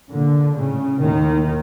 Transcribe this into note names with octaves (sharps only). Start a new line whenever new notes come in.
A#2 D3
A2 C#3
D#2 A2 D#3